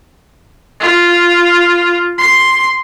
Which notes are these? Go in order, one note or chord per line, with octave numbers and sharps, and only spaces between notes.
F4
C6